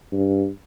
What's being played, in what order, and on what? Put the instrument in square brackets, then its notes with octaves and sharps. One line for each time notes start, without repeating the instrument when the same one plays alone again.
[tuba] G2